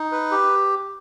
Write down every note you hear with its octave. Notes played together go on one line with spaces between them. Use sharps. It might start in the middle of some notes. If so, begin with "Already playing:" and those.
Already playing: D#4
B4
G4